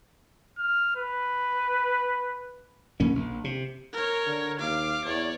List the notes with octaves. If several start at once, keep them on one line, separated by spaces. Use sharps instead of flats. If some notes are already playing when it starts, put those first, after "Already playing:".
F6
B4
A#2 F3 A#3 C#4
A#1
C3
A#4 C#5
D3
D#2 F5 D6
E2 C#5 D5